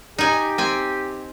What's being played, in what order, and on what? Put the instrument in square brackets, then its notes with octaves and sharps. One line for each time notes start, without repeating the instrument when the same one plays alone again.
[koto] D#4 G#5 [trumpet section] G4
[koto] C4 G#5